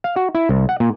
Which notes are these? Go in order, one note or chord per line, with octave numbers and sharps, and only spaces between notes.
F5
F#4
E4
C2
F#5
A#2